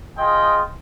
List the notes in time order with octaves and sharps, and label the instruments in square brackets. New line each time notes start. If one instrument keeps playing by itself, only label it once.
[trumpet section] F4 G#4 D#5 G5